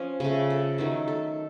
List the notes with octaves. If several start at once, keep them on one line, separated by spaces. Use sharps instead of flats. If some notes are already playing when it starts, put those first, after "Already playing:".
Already playing: F3 C#4
C#3 A3
A4
D#3 F#3 A3
A4